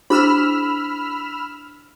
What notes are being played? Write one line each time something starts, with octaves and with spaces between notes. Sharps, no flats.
D4 E4 G#4 C5 B5 E6 F6